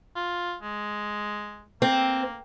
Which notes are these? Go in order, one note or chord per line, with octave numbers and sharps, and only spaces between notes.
F4
G#3
A#3 C4